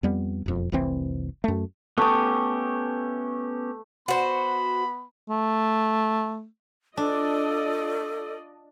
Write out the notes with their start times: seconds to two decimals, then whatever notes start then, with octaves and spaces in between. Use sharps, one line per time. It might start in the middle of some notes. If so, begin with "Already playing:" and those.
0.03 F2 G3 B3
0.46 E1 F2
0.72 F1 C2 E3 C4
1.44 F#2 A3
1.98 A3 B3 C#4 G4 D#6
4.08 B3 F#4 C5 B5
5.29 A3
6.97 D4 F4 A4 D5 D#5